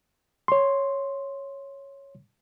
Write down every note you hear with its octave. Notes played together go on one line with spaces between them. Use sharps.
C#5 C6